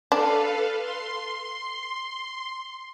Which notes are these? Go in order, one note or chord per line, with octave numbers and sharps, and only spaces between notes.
D4 A4 B4 F5
C6